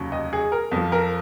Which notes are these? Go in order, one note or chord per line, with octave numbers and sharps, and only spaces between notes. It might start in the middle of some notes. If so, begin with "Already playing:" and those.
Already playing: F1 D#2 C#3 F#3
D#5
G#4
A#4
F2 F3
A#4